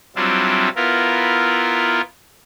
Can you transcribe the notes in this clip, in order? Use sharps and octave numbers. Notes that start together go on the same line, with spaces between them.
F#3 G3 C4 D4 E4 F4
B3 E4 F4 A#4